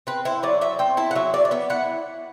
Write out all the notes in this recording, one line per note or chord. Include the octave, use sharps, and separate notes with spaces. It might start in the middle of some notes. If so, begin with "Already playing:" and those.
C4 B4
E4 C5
F#3 D5
F#3 E5
C4 G5
E4 A5
F#5
F#3 E5
F#3 D5
D5
B3 E5
E4 F#5